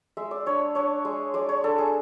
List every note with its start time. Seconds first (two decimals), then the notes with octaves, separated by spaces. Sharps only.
0.17 G#3 E5
0.31 D5
0.46 D4 C#5
0.75 D4 C#5
1.05 G#3
1.34 G#3 D5
1.49 C#5
1.64 D4 A4
1.78 G#4